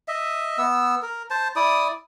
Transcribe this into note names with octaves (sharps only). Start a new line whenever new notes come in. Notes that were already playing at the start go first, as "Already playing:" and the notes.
D#5 E5
B3 E6
A#4
C5 A5
E4 D5 D#6